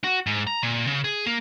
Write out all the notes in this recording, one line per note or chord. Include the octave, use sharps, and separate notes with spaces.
F#4
G#2
A#5
A#2
C#3
G#4
A#3